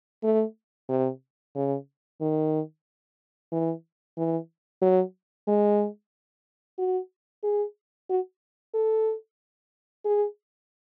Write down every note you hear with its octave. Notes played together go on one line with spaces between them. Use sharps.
A3
C3
C#3
D#3
E3
E3
F#3
G#3
F#4
G#4
F#4
A4
G#4